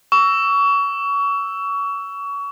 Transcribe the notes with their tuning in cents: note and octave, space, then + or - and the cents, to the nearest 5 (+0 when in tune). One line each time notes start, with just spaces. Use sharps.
C#6 +30 E6 +0